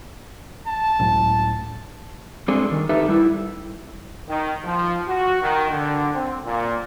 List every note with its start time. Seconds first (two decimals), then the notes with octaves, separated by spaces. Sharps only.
0.67 A5
0.99 C#2 A2 F#3
2.48 G3 G#3 C4 D4 G#4 A4
2.71 D#3
2.89 D#4 G4 A4 B4 E5
3.08 G3 E4
4.28 D#3
4.64 F3
5.08 F#4
5.42 D#3
5.71 D3
6.14 C4
6.44 A#2